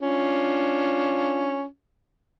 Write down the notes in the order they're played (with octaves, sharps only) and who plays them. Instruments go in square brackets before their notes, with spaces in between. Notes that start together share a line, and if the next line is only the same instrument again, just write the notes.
[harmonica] C#4 D4 F4